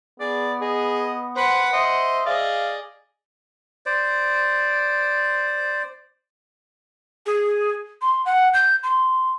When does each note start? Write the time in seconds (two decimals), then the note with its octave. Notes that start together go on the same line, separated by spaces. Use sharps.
0.20 B3 G#4 D5
0.61 G#4 D#5
1.36 B4 C5 F#5
1.73 C5 D#5 E5
2.26 G#4 D5 D#5 F5
3.86 C5 D5
7.26 G#4
8.02 C6
8.25 F#5
8.54 G6
8.83 C6